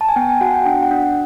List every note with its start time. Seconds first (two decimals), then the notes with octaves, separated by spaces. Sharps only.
0.01 A5
0.09 G#5
0.16 B3 G5
0.29 G#5
0.41 F#4 F#5
0.54 G5
0.66 D4 G5
0.83 F#5
0.91 D4